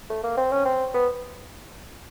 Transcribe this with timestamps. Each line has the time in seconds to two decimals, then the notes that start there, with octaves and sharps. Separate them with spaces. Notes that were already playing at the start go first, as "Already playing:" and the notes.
0.10 A3
0.24 A#3
0.37 C4
0.52 C#4
0.65 C4
0.94 B3